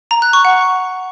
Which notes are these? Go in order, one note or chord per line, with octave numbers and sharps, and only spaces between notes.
A#5
F#6
C#6
F#5